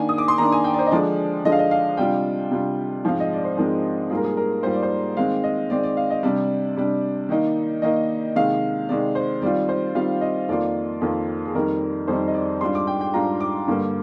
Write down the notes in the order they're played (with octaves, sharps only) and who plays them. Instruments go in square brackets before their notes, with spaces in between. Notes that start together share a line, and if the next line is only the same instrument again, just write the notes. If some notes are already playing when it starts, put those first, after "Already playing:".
Already playing: [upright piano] D#3 A#3 D4 G#5
D#6
D6
C6
D#3 A#3 D4 A#5
G#5
G5
D5
C5
D#5
D3 F3 G#3 D4 D5
D3 F3 G#3 D4 D#5
F5
D#5
F5
C3 G3 D4 F4 G5
C3 G3 D4 F4
G#2 F3 G#3 C4 F5
D#5
D5
C5
G#2 F3 G#3 C4 A#4
G#2 G3 A#3 F4 G#4
A#4
G#4
A#4
G#2 G3 A#3 F4 C5
D5
C5
D#3 G#3 C4 F5
D#5
D#3 G#3 C4 D5
D5
F5
D#5
C3 G3 D4 D5
C3 G3 D4
D#3 A#3 D#4
D#3 A#3 D#4 D#5
C3 D#3 G#3 F5
C3 D#3 G#3 D5
C5
D#3 G3 C4 F4 D5
C5
D#3 G3 C4 F4 F5
D#5
F2 D#3 A#3 F4 D5
F2 D#3 A#3 F4
G#4
F2 D#3 G3 C4 D#4 A#4
F2 D#3 G3 C4 D#4 C5
D#5
D5
G#2 G3 D4 F4 C6
D6
G5
G5
G#2 G3 D4 F4 A#5
D6
G2 D3 G3 A#3